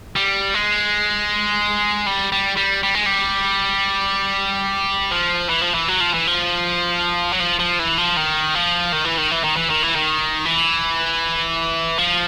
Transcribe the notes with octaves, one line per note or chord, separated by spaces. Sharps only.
G3
G#3
G3
G3
G3
G3
G#3
G3
F3
E3
F3
E3
F#3
F3
E3
F3
F#3
F3
F3
E3
F3
D#3
F3
D#3
E3
D#3
E3
D#3
E3
D#3
E3
D#3
E3
F3